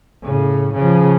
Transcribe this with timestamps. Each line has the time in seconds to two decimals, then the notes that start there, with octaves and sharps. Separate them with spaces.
0.24 A2 C#3
0.74 C#3 F3